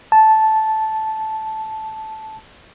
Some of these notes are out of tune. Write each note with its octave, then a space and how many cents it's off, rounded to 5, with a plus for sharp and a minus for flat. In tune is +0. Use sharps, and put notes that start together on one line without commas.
A5 -10